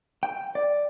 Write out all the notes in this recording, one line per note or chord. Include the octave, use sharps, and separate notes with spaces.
G5
D5